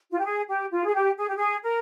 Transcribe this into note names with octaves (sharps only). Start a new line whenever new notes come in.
F4
G4
G#4
G4
F4
G#4
G4
G#4
G4
G#4
A#4